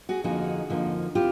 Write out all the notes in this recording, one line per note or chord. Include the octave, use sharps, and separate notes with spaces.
F#4 G#4
F2 D3 F3 A#3 D#4 F#4 G#4
F2 D3 F3 A#3 D#4
C4 E4 F4 G4